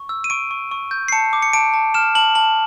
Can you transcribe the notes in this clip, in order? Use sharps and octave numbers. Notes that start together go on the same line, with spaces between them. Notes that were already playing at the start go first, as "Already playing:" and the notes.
Already playing: C#6
E6
D#7
C#6 D7
C#6
C#6
G6
C7
A5 C#7
D6
C#7
A5 D7
A5
F6 E7
A5 F#7
A5 F#7